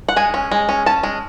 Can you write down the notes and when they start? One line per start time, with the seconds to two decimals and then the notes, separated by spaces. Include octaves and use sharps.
0.09 F#5
0.16 G#3 G#5
0.34 C#4
0.51 G#3
0.69 C#4
0.86 C#4 A5
1.03 G#3